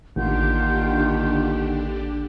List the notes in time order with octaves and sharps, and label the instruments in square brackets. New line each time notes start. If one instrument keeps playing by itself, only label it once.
[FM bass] A1 [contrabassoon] D#2 [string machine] D3 D4 G4 [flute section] F4 F#5 G6